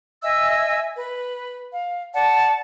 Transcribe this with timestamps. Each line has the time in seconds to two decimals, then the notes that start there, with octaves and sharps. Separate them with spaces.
0.23 D#5 E5 G#5 E6
0.96 B4
1.72 F5
2.14 D5 F#5 A5